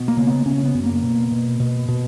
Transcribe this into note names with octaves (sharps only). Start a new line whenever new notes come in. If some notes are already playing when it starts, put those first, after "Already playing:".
Already playing: B2
A#3
C#3
B3
C#3 C#4
B3
F#2
A#3
B2
B2
B2
B2